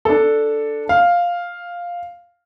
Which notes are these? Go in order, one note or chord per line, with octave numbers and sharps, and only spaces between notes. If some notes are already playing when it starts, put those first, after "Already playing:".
D4 A4
F5